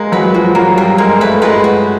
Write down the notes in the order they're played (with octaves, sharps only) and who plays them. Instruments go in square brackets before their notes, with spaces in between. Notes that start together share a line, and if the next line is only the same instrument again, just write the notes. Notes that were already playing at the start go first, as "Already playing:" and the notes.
Already playing: [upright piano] G#3 [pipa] A#3
[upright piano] F#3 [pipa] B4
[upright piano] F3 [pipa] F#4
[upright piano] F#3 [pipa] A#3
[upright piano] G3 [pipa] A#3
[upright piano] G#3 [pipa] A#3
[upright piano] A3 [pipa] B4
[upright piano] G#3 [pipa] B4
[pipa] F#4